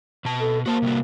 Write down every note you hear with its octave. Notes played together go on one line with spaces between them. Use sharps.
B2 A5
A4
A#3 F#4 C5 A5
C3 G3 F#4